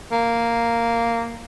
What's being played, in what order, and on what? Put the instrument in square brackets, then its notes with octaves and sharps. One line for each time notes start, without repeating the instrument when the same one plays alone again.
[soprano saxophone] A#3